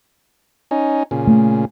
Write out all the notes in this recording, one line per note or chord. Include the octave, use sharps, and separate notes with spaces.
C#4 D#4
A#2 C#3
A3